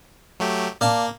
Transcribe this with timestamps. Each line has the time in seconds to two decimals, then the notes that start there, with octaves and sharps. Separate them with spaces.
0.40 F#3 A3 G4
0.81 A#3 D5 F5 A5